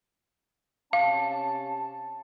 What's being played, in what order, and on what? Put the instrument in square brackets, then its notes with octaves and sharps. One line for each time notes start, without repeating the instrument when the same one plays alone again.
[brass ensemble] C3 C#4 A5 [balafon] F5